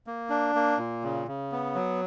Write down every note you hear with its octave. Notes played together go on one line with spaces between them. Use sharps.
A#3
D4
A#3
A#2
C#3
C#3
B3
F#3